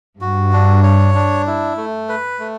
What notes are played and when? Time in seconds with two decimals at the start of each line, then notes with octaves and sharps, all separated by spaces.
0.21 G2 F#4
0.53 D4
0.83 C#5
1.15 D4
1.47 E4
1.77 A3
2.09 B4
2.39 A3